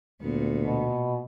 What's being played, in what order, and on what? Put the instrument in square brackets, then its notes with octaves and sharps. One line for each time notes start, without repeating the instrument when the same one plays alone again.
[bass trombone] D2 [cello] A#2 B3
[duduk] B2